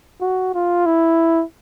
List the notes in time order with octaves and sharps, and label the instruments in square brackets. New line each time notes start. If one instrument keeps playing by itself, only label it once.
[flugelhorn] F#4
F4
E4